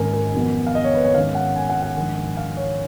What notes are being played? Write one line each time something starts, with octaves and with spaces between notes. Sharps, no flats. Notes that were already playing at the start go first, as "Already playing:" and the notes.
Already playing: G#1 G#2 D#3 A#3 C#4 A#4 G#5
A#4
F2 D#3 F#3 B3
F5
D#5
C#5
B4
C#5
G#1 G#2 D#3 G#3 C#4 F5
F#5
G#5
F#5
F#5
A#1 G#2 D#3
F5
C#5